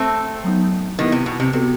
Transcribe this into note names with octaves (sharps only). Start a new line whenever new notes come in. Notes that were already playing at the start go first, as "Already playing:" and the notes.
Already playing: A3 C4
F#3 B3 D#4
D#3 B3 E4 G4 B4
C3
B2
C3
C3 B3 F#4 A4